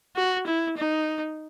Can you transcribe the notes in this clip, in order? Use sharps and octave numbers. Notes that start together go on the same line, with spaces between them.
F#4
E4
D#4